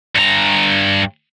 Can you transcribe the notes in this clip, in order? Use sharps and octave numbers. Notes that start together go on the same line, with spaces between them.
G2 A#5